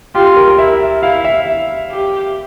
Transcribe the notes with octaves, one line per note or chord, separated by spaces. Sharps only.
F4 G4
G4
A#4
A#4
E4 E5
E4 F5
E5
G4